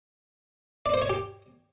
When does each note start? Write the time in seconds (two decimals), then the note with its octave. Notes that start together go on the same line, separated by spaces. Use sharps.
0.86 D5
0.94 C5
1.02 C#5
1.10 G4